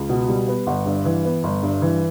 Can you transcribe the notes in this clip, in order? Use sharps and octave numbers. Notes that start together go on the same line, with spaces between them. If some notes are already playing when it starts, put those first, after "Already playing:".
Already playing: C#2
B2
G3
B3
G1 F#5
G2
E3
B3
G1
G2
E3